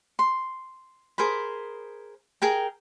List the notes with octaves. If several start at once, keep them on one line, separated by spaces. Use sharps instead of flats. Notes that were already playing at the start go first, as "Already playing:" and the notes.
C6
G#4 A#4 C5 B5
G#4 A#4 G5